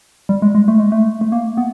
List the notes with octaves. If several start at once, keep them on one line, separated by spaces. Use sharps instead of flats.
G3
G#3
G#3
A3
G#3
A3
A3
A#3
B3